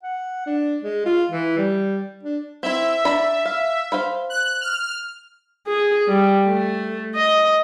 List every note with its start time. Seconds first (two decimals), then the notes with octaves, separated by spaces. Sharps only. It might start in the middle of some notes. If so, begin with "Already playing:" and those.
0.03 F#5
0.46 D4
0.82 G#3
1.06 F4
1.31 E3
1.58 G3
2.23 D4
2.63 C4 E4 E5
3.05 D4 A#5 B5
3.46 F5
3.92 C5 F5 B5
4.30 F#6
4.61 F6
5.67 G#4
6.08 G3
6.46 A3
7.16 D#5